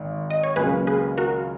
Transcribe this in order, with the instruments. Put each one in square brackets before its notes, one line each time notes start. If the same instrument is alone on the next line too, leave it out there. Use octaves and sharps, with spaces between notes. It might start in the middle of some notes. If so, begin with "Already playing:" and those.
Already playing: [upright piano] G#1 D#3
[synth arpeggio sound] D#5
C#5
[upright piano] C#2 C#3 F#3 A#3 [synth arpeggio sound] G#4 B4
[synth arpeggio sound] G#4 B4
F#4 A#4